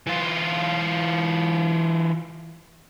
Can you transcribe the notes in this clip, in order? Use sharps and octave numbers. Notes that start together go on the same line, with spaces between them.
E3 F4